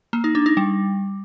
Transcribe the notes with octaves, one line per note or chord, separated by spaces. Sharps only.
A#3
D#4
D4
D#4
G3